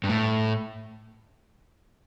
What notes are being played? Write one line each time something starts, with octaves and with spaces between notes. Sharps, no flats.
G2
A2